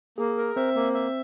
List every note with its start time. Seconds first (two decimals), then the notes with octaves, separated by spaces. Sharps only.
0.18 A#3 G#4
0.37 A#4
0.56 C4 C5 E5
0.75 A#3
0.94 E5